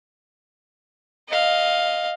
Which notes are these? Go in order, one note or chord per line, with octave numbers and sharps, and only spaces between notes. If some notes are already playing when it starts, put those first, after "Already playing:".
D#5 F5